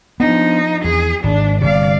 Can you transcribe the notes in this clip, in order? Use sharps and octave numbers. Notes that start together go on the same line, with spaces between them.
F3 B3 D4 D#4
E2 G#4
G#1 D4
G1 C3 D5 F5